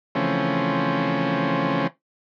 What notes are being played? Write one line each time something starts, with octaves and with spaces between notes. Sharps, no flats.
C#3 E3 F3 A3 C4 C#4